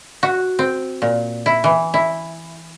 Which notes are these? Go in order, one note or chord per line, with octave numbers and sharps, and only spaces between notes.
F#4
C4
A#2
E4
E3
E4